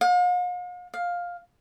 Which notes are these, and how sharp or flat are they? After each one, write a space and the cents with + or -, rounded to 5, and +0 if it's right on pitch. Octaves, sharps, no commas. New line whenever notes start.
F5 +45
F5 +10